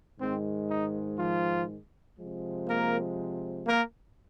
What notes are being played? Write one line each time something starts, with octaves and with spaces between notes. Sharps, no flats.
G#2 D#3 G#3 C4
D#4
F3 F4
C3 F3 G#3
A#3 A#4
A#3 A#4